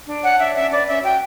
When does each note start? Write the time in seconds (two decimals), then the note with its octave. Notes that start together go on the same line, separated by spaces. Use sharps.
0.07 D4
0.22 C#5 F#5
0.38 D4 E5
0.55 C#4 E5
0.71 B4 D5
0.87 C#4 E5
1.03 F#4 G5